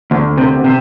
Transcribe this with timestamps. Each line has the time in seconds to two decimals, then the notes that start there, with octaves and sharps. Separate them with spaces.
0.11 D2
0.38 C3
0.64 C3